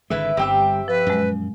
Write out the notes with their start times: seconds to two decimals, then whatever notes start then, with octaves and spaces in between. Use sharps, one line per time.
0.10 G#1 D3 G#3 E4 B4 E5
0.37 G1 G2 D3 G3 C4 G4 E5
0.88 F3 B4
1.07 F#2 A#2 G#3